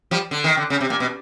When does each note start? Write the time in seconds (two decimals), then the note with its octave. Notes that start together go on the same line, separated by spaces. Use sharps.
0.11 F3 G3
0.31 D3
0.44 D#3
0.57 D3
0.70 C#3
0.81 C3
0.90 A#2
1.00 B2